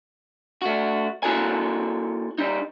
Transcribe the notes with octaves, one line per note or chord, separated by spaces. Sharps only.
A3 F#4
A#3 E4 F#4 A4 G#5
G3 D#4